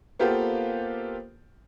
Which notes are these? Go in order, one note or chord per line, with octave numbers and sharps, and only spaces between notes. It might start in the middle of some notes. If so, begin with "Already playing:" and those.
A#3 B3 F4 G4 A4 C5